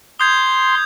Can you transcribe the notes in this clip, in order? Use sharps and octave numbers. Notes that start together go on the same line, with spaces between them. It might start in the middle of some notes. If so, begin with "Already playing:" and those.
C6 D#6 G6 G#6